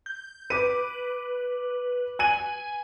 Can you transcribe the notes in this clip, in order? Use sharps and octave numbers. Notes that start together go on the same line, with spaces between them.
G6
B4 D6 D#7
G#5 G#6 D#7 F#7